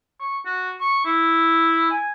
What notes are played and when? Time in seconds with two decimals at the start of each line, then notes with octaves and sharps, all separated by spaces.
0.20 C#6
0.46 F#4
0.81 C#6
1.05 E4
1.91 G#5